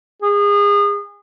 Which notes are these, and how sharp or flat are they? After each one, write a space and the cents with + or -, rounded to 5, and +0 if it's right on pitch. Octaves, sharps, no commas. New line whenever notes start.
G#4 -30